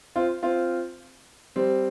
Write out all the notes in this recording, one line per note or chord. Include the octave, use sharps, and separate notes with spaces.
C4 F4
C4 F4
G3 C4